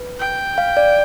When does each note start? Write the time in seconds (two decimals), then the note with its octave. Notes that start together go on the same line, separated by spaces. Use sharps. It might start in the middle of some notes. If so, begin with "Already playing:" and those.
Already playing: B4
0.19 G5
0.58 F5
0.77 D5